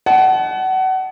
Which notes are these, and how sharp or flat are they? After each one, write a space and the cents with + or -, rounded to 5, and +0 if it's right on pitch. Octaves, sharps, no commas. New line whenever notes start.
D#5 +0 F#5 +30 A5 -30